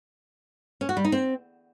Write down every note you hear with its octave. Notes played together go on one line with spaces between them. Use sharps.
C#4
F#4
G3
D#4
C4